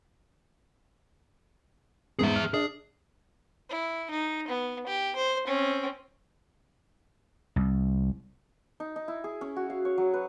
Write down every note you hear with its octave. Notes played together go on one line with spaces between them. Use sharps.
E2 G#2 G#4 E5
F6
D4 G#4
E4
D#4
B3
G4
C5
C4 C#4
C2
D#4
D#4
E4
G#4
C#4
F#4
F5
C#5
F#3
B4